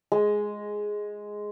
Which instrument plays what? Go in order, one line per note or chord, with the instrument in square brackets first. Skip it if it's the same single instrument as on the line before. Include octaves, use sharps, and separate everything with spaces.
[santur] G#3